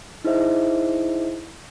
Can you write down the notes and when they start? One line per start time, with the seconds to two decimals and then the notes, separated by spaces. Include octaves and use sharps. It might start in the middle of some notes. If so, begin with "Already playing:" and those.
0.24 D#4 E4 G#4 C5 D#5 E5